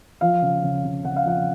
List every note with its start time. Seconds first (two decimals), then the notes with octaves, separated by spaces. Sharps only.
0.21 F3 F5
0.42 C#3
0.63 C#3
0.84 C#3
1.05 C#3 F#5
1.16 F5
1.25 F3 F#5